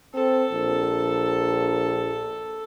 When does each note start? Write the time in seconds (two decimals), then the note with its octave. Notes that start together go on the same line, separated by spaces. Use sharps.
0.14 C4 A4
0.51 A#1